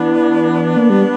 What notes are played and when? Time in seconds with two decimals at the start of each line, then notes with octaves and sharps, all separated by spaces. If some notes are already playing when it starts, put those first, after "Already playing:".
Already playing: E3 B3 D4
0.77 A#3
0.90 G3